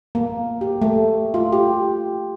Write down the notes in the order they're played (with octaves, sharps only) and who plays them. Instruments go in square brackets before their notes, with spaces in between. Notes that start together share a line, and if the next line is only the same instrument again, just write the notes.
[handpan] A#3
G4
A3
F4
G4